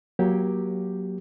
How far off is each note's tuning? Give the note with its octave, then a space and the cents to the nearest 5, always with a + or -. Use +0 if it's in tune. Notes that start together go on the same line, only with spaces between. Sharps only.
F#3 +0 A#3 +20 G4 +0